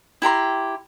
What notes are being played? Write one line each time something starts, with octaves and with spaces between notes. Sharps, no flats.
E4 G4 A#5 C6